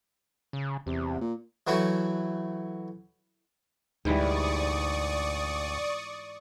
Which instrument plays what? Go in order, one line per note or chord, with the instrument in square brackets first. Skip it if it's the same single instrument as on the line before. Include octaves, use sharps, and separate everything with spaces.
[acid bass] C#3
[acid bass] E2 [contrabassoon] C3
[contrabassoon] A#2
[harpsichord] E3 F#3 A3 E4 F#4
[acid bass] D2 [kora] G#2 E3 G3 [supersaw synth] D5 C#6 D#6